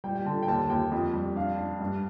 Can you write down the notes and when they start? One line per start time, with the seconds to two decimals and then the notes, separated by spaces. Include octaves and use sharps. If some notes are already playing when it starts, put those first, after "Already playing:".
0.04 G3 G5
0.15 G5
0.26 D3 A5
0.43 G5
0.48 D#2 A5
0.69 D#2 G5
0.92 F2
1.14 G3
1.36 D4 F5
1.58 D4
1.80 G2